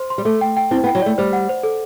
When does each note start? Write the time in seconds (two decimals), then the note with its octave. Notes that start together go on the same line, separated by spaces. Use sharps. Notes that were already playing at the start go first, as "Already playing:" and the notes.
Already playing: C5 C6
0.10 C6
0.18 G3
0.25 A3 A4
0.41 G5
0.57 G5
0.71 C4 E4
0.84 B3
0.87 G5
0.95 F#3
1.02 A3 D5
1.18 G3 C5
1.33 F#5
1.49 C5
1.63 A4